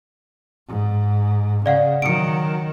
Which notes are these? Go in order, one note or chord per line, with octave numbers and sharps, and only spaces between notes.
G#2
C#3 D5 F5 F#5
D#3 F#3 C#7 D7